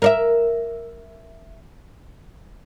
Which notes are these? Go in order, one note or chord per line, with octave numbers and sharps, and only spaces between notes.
A#4 D5 E5